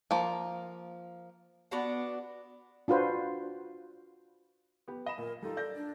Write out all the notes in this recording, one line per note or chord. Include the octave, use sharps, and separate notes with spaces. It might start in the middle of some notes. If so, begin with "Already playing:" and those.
F3 A#3
B3 D4 F#4 F#5
D4 F4 F#4 B4 C5
B3 G4
D#5 B5 E7
A#2 A#4
G3 D#4 F4 A4
D5 G6 A#6
D4